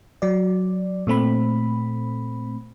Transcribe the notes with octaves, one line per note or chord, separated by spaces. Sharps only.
F#3 D5
A#2 A3 C4 B5